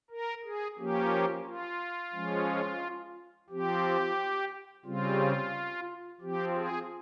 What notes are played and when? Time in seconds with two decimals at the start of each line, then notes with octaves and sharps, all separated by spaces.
0.10 A#4
0.44 G#4
0.77 F3 A#3 C#4 G4
1.45 F4
2.14 F3 G#3 C#4
3.49 F3 C4 G4
4.85 C#3 G3 C4 F4
6.21 F3 C4 G4
6.55 G#4